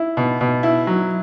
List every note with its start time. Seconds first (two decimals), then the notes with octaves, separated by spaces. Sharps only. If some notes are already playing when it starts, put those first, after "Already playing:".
Already playing: E4
0.17 B2
0.41 B2
0.63 E4
0.87 F#3